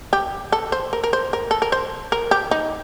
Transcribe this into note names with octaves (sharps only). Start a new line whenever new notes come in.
G4
A4
C5
A#4
A#4
C5
A#4
A4
A#4
C5
A#4
G4
D#4